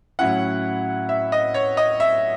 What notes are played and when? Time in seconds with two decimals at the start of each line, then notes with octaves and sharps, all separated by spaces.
0.19 A2 F#3 C#4 E4 F#5
1.09 E5
1.32 D#5
1.54 C#5
1.77 D#5
2.00 E5